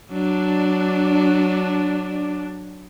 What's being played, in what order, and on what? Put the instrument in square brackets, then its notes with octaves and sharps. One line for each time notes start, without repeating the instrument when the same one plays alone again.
[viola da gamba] F#3 [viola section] D4